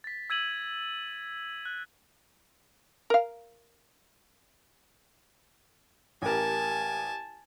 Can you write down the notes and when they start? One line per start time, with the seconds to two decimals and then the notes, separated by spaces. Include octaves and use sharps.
0.04 A6 B6
0.30 E6 G#6 D#7 F#7
1.65 F#6
3.10 A#4 F5
6.22 A1 G4 A#4 G#5 A5